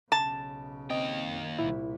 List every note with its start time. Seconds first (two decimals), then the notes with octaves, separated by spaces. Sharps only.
0.12 B1 C#3 A5
0.90 D#2 C4 D#5 G5
1.23 F#2
1.59 C2 A#2 E4